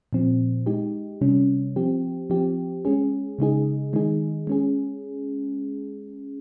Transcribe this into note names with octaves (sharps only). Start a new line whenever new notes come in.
A#2 F3 C4
G#3 D#4 G4
C3 G3 C#4
F3 C4 G4
F3 C4 G4
G#3 C#4 G#4
C#3 G#3 D#4 G#4
D#3 G#3 D#4 G#4
G#3 C#4 G#4